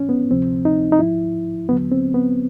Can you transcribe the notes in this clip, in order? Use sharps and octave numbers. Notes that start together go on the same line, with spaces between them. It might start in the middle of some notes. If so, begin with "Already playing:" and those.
Already playing: G#2 E3 C#4
B3
D2 C3 F3 C4
D#4
D#4
G#2 F3 E4
D#2 D3 F#3 B3
C4
B3